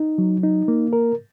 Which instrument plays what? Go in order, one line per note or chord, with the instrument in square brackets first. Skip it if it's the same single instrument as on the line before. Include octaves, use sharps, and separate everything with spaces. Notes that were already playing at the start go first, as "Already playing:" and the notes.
Already playing: [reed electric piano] D#4
F#3
D#4
A#3
A#4